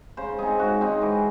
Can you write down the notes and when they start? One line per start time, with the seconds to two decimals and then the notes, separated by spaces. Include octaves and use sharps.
0.17 C#3 C5
0.39 G#3 C4 D#4 G#4
0.59 C#3 F#4
0.81 G#3 C4 D#4
1.02 E3